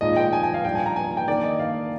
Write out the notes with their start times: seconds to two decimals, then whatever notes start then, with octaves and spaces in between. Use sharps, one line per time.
0.01 A#2 G#3 D#4 D#5
0.16 G5
0.33 G#5
0.43 G#5
0.54 F5
0.65 A#2 G3 D4 G5
0.75 G#5
0.86 A#5
0.96 G#5
1.17 G5
1.28 D#3 A#3 D4 D5
1.44 D#5
1.59 F5